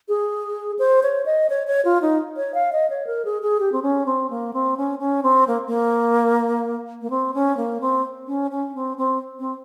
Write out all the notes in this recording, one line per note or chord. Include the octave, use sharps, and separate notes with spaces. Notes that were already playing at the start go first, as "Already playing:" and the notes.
G#4
C5
C#5
D#5
C#5
C#5
F4
D#4
C#5
F5
D#5
C#5
A#4
G#4
G#4
G4
C4
C#4
C4
A#3
C4
C#4
C#4
C4
A#3
A#3
A#3
C4
C#4
A#3
C4
C#4
C#4
C4
C4
C4